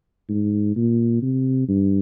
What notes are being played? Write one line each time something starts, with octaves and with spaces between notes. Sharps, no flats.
G#2
A#2
C3
G2